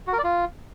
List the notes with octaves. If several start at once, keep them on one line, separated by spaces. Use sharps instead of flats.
F#4
A#4
D5
F4